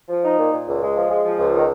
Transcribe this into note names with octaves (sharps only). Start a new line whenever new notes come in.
F3
D#4
A#2
A#2
C#2
G#3
F3
G#3
F3
C#2
D#3